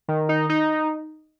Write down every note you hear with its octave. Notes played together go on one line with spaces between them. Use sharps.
D#3
D#4
D#4